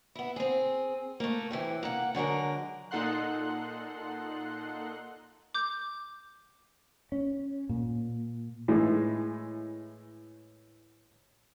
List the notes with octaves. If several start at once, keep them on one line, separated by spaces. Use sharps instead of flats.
B3 E4
C4 G#4
A3 A#3
A2 C3 E3
A#3 F#5
D3 F#3 G#3 A#4
A#2 D#4 A4 F#5 C6 F#6
D6 G6
C#4
A#2
A2 E3 G#3